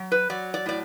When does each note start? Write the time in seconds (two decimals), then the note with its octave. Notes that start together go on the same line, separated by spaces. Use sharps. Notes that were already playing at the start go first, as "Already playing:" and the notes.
Already playing: F#3
0.12 B4
0.30 F#3 D5
0.54 D5
0.66 A2 D5